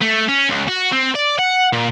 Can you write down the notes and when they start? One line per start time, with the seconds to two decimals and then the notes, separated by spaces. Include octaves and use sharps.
0.01 A3
0.29 C#4
0.50 C#2
0.68 F#4
0.93 C4
1.15 D5
1.39 F#5
1.73 A#2